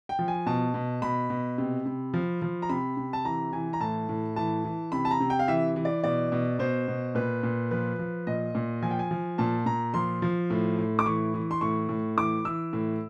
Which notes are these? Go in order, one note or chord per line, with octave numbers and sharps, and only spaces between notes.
G5
F3
G#5
B2 A5
B2
B2 B5
B2
C3
C3
F3
F3
A#5
C3 B5
C3
A5
E3 A#5
E3 G#5
A#5
A2 A5
A2
E3 A5
E3
C3 B5
A5
A#5
C3
G5
F5
E3 E5
E3
D5
B2 D5
B2
B2 C5
B2
A#2 B4
A#2
F3 B4
F3
A#2 D#5
A#2
F3 G#5
G5
G#5
F3
A#2 A5
A#2 A#5
F3 C6
F3
A2
A2
D6
E3 C#6
E3
C6
A2 C#6
A2
E3 D6
E3 E6
A2